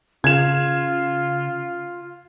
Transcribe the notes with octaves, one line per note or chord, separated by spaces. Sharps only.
C#3 F4 G#6 E7